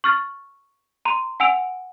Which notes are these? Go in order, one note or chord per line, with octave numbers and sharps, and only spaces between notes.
C#6 F6 A6
A#5 C6
F#5 G#5 E6 D7 F7